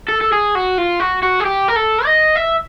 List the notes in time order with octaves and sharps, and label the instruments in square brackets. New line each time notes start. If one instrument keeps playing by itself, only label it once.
[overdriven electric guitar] A4
A4
G#4
F#4
F4
F#4
F#4
G#4
G4
A#4
A4
D#5
E5